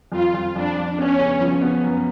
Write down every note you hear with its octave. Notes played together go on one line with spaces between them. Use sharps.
F2 F4
F2
F2 D4
F2
B3 C#4
C#3
F3
B3
F#2